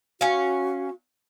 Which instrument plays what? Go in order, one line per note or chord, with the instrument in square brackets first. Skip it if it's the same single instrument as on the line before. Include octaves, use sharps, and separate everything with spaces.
[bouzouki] C#4 F5 [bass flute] F#4